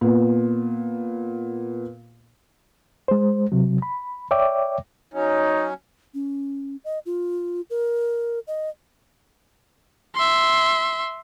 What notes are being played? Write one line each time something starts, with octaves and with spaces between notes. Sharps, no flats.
A#2 B3
G#3 C5
C3 F#3
B5
C#5 D5 E5 G5 D6
F#3 C#4 D#4
C#4
D#5
F4
A#4
D#5
E5 C6